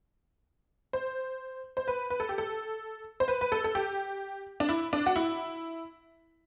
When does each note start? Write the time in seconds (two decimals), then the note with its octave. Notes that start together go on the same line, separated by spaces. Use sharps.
0.93 C5
1.77 C5
1.88 B4
2.10 B4
2.20 A4
2.29 G4
2.38 A4
3.20 C5
3.28 B4
3.41 B4
3.52 A4
3.64 A4
3.75 G4
4.60 D4
4.69 E4
4.93 D4
5.06 F#4
5.16 E4